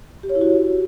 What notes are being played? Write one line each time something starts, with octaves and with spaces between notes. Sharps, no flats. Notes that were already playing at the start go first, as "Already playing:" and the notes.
G4
C#5
E4
F#4